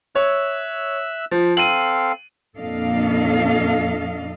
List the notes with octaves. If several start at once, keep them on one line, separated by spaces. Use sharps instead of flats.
C#5 E5 E6 F#6
F3
C4 A4 F5 D#7 F#7
F2 A#2 D4 A4 D#5 F5